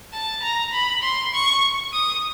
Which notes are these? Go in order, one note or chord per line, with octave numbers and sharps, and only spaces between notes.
A5
A#5
B5
C6
C#6
D#6